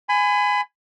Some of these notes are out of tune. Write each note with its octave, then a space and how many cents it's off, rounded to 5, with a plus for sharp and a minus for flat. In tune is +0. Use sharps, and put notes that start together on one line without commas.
G#5 +0 B5 +30